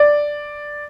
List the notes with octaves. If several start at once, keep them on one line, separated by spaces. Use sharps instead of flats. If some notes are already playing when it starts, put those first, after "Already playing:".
Already playing: D5